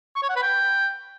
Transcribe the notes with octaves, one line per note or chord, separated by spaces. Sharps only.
C#6
C#5
F#5
B4
G5